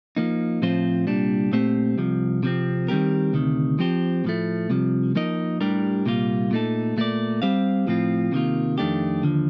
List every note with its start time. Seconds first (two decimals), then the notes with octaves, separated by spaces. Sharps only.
0.17 F3 A#3 D#4
0.62 A2 F3 C4 F4 C5
1.07 C2 A#2 G3 D4
1.52 A#2 A3 C4 G4 C5
1.98 C2 C3 F3
2.43 C3 F3 C4
2.88 D#3 G3 C4 G4 A#4
3.33 D2 C3 D#3
3.79 F3 C4 G4 C5
4.25 A2 F3 A3
4.70 C2 C3 F3
5.15 F3 A#3 D#4 A#4 D#5
5.61 A2 G3 D4 G4 A#4
6.05 C2 A#2 G3 A#3 F4
6.51 A#2 A3 D#4 A4
6.97 A#2 A3 D#4 A#4 D5
7.42 G3 C4 G4 C5 F5
7.87 A2 F3 C4 F4
8.32 C3 D#3 A#3 F4
8.78 F2 D#3 A3 D4 G4
9.23 D#2 D3 F3